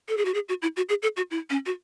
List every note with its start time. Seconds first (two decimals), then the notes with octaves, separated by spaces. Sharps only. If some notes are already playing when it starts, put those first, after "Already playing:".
0.09 A4
0.17 G#4
0.25 F#4
0.34 G#4
0.49 F#4
0.62 E4
0.77 F#4
0.89 G#4
1.02 A4
1.17 F#4
1.31 E4
1.50 C#4
1.66 F#4